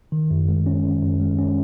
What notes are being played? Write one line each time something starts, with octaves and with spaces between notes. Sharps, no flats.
D#3
F#2
G#3
C#4
D#3
F#2
G#3
C#4